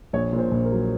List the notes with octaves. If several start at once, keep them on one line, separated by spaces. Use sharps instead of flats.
A#1 C#5
A#2
C5
A#1
A#4
F#3